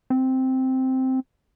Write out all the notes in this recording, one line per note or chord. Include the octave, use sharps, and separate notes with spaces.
C4